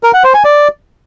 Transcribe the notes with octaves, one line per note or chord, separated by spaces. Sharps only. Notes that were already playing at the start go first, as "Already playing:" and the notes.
A#4
F#5
C5
G#5
D5